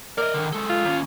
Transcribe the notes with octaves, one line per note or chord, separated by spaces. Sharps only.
A#4 D5 D#5
D3 D#3
G#3 A4
F4
D#2 C#4